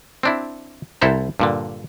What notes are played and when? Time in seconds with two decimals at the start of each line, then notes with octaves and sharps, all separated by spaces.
0.23 C4 D4 E4
1.01 C2 E4 A4 C5 A#5
1.40 G2 A#2 D3